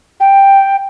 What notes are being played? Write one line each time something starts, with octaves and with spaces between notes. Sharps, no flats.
G5